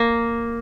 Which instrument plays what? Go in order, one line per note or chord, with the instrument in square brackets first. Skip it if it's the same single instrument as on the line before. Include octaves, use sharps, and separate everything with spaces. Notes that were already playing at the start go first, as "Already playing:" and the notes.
Already playing: [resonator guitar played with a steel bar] A#3